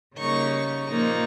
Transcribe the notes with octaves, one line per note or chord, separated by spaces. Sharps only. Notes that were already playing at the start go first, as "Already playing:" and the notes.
C#3 G3 A#3 D#4 C#6
C#6
A#2 F3 A#3 D#4